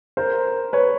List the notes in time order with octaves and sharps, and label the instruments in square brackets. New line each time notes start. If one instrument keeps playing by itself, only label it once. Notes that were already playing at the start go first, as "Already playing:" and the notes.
[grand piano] A#4 C5
B4 C#5